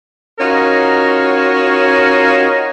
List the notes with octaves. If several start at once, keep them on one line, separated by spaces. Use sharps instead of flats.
C#4 D#4 F4 F#4 A#4 C#5